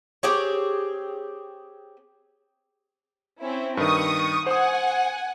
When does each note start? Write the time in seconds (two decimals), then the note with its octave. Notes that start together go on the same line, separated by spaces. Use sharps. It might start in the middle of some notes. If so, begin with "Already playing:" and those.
0.23 C4 G4 G#4 C#5
3.40 C4 C#4 E4
3.77 G2 D#3 C#6 D#6
4.46 C5 F#5 G#5 D#6